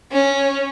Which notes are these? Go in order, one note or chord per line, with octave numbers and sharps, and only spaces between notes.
C#4